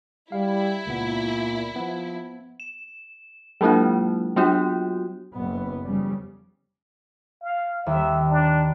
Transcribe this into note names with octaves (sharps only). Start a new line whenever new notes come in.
G3 E4 F5
C#2 A#2 B3
F3 B3
E7
F#3 G#3 A#3 D4 E4 F4
F#3 B3 D4 F4 F#4
F#1 B3
F2 C#3 G3
F5
D#2 E5
D4